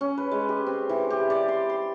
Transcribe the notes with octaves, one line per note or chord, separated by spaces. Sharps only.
C#4
B4
G#3
G4
C4
E3
G4
D5
C6
C6